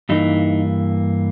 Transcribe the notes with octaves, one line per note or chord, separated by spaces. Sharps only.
G2 E3 A#3 D#4